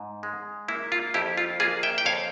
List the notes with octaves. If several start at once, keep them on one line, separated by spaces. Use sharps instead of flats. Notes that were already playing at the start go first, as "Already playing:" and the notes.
Already playing: G#2
G#3
A#3 E4
F4
F2 E4 G4
F4
A#3 F4 G#4
E5 G5
G5
F2 C#5 F5